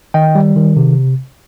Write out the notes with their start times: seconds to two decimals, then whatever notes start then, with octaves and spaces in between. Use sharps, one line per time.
0.14 D#3 D#5 G5
0.35 G3
0.56 D#3
0.77 C3